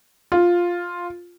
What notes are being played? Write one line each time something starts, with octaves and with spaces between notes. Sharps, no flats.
F4